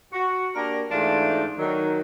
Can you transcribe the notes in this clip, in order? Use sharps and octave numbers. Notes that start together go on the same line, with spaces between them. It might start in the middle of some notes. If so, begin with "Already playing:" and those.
F#4
A#3 D4 G4 A#4
G#2 E3 A3 D4 F4
D#3 F#3